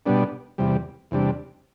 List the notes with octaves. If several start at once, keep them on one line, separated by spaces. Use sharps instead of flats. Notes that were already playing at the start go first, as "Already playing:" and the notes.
B2 G3 B3 D4
E2 C3 G3
E2 C3 G3 D4